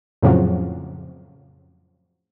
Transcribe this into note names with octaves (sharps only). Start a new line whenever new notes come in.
F2 A2 C#3 F3 F#3